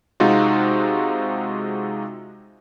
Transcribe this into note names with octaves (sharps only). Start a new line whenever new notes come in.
C3 G#3 C4 D#4 F4 F#4